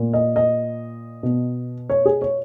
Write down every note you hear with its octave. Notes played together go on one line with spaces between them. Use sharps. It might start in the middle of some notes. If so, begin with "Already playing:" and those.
Already playing: A#2
D#5
D#5
B2
C#5
G#4
C#5